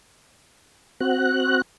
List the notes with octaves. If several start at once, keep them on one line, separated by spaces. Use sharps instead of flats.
C4 F#4 F#6